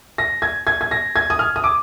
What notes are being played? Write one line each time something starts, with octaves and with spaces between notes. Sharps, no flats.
A#6
G#6
G#6
G#6
A#6
G#6
D#6
F6
D#6
D6